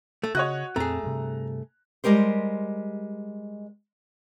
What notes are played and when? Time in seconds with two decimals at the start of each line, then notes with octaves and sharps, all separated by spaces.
0.23 A3
0.35 C#3 F#4 C#5 D#5 F#6
0.76 F2 A#2 A3 C4 G#4 A#5
1.03 G2 C3
2.04 G3 G#3 G4 A#4 C5